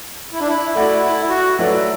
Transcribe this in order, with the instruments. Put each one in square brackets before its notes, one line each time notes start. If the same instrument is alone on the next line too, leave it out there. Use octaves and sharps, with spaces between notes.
[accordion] E4
D4
E4
[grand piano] A3 F#4 D5 [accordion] E4
[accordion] E4
F#4
[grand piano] F#3 A3 E4 B4 D5